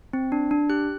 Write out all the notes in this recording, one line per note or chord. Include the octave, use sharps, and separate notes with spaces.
C4
D4
D4
G4 F#6